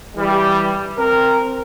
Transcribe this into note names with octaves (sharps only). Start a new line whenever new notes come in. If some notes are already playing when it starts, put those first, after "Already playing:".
E3 G3
C4 A#4